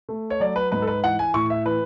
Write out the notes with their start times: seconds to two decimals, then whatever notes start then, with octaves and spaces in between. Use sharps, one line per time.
0.09 A3
0.30 C#5
0.40 F#3 D5
0.56 B4
0.72 G#2 B4
0.82 A4
0.87 B4
1.04 E3 F#5
1.19 G#5
1.34 A2 C#6
1.50 E5
1.65 E3 B4